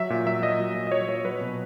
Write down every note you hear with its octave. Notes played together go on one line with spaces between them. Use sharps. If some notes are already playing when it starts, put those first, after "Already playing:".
Already playing: F#3 E5
A#2
F#3 E5
A#2 D#5
F#3
A#2
D#5
F#3 C#5
A#2 C#5
F#3 B4
B2